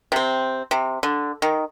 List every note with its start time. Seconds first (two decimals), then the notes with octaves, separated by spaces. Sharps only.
0.12 C3 C4
0.71 C3
1.03 D3
1.42 D#3